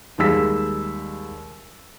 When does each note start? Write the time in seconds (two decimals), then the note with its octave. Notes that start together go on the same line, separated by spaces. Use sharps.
0.18 D#2 G3 G#3 E6 B6